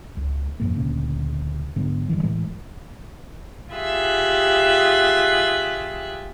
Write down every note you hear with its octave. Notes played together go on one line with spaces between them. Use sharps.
C#2
F2 G#2 A#3
D2 A#2 C#3
G#2 D3 F#3 B3
G2 D3 E3
A2 E3 G#3
F4 G4 G#4 E5 F#6